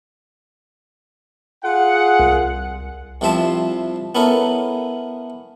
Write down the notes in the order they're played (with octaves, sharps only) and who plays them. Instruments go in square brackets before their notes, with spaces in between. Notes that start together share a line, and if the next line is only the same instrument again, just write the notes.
[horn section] F4 G#4 F#5
[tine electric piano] C2
[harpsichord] C2 C3 F3 C5 E5 A5
B3 C#4 E4 A4 A#4